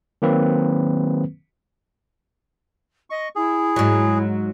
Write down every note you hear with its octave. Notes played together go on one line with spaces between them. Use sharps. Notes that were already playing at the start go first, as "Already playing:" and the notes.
D#3 F#3 A#3 C4 B4
D#5 C#6
E4 G#4
G#2 F#3